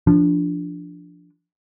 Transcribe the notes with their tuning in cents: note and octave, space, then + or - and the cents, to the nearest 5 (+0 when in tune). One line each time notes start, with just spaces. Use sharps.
F3 -15 D4 -5